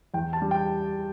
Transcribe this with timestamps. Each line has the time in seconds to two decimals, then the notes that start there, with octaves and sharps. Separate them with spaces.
0.14 E2 G5
0.33 A5
0.42 G3
0.51 G5